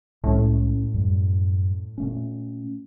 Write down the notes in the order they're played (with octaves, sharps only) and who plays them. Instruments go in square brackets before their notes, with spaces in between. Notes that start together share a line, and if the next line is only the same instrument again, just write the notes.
[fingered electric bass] C2 G#3 C#4 [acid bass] A2
[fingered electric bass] F#2 G3
A#2 A3 C#4